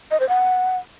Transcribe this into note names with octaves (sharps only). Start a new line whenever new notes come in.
D#5
C5
F#5